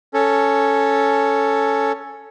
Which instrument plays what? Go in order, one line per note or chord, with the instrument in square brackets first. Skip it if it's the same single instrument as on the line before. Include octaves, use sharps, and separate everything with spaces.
[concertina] C#4 A4